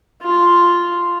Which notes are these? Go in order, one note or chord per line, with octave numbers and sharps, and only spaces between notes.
F4